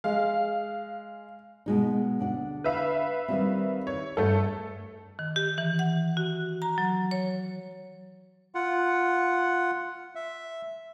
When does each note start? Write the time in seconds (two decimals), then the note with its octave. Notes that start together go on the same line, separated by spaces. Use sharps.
0.04 G#3 F5
1.66 B2 G#3 D#4
2.19 D2 D4 F#5
2.64 B4 E5 F5
3.28 D#3 G3 C4
3.87 C#5
4.17 G2 A3 A4
5.19 D#3
5.36 G4
5.58 E3
5.79 F#5
6.17 F#4
6.62 A#5
6.78 F#3
7.11 C#5
8.55 F4 F#5
10.15 E5